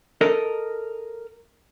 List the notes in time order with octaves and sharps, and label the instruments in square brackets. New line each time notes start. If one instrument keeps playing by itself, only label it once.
[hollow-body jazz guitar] A4 A#4 D#5